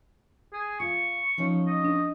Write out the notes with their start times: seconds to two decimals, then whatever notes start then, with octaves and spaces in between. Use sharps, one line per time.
0.53 G#4
0.80 F4 C#6
1.38 F3 C#4 D#4
1.67 D#5
1.85 D4